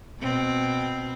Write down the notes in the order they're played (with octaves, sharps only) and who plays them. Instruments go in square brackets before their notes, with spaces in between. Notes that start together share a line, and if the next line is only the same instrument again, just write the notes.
[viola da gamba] B2 C4